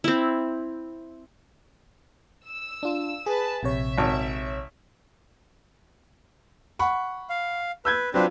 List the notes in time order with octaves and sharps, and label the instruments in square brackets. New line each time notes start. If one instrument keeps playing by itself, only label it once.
[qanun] C4 E4
[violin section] E6
[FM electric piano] D4 F4
[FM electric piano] G#4 [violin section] B4 A5
[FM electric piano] A#1 C3 C#5 [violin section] E5
[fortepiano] G#1
[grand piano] F#5 B5 C#6
[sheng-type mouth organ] F5
[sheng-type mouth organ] B4 [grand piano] E6 G6 G#6
[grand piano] F#3 F4 [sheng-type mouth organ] C4 D4 B4